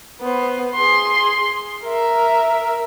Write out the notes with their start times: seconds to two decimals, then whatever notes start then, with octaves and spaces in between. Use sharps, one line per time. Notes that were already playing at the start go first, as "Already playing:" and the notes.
0.21 B3 C5
0.75 G#4 C6
1.84 A#4 E5